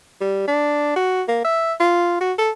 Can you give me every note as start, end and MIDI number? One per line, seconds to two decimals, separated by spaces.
0.21 0.43 55
0.48 0.91 62
0.96 1.23 66
1.28 1.44 58
1.45 1.74 76
1.80 2.20 65
2.21 2.33 66
2.38 2.51 69